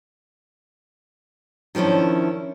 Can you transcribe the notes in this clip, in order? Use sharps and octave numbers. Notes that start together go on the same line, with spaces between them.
D#3 F3 C#4 D4 E4